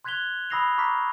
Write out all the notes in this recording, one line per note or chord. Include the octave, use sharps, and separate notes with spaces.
C6 F#6 G#6 B6 F7 G7
B5 D#6 E6 A#6 C7 F7
A#5 C#6 D6 F6 B6